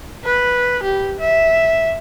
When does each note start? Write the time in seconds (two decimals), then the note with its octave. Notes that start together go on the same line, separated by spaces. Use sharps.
0.25 B4
0.83 G4
1.20 E5